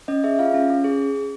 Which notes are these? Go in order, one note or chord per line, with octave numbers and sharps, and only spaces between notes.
C#4 D#5
G#4 E5
F4 F5
C#4
C#4
G#4